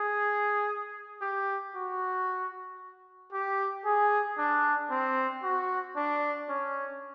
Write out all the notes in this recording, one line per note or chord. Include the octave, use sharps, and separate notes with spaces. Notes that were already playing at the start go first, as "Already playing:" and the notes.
Already playing: G#4
G4
F#4
G4
G#4
D4
C4
F#4
D4
C#4